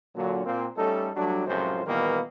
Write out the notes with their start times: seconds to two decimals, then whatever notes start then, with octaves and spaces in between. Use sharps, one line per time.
0.16 A#2 D3 F#3
0.46 A#2 A#3 C4
0.77 G3 A3 C#4 D#4 A4
1.16 F#3 G3 A3 D4
1.46 C#2 F#2 A2 C3 F3 C5
1.87 A#2 D#3 E3 G3 A#3 B3